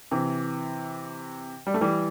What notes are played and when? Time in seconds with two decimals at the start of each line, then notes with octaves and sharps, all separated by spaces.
0.11 C3 E3
1.67 G3
1.74 A3
1.81 E3 G3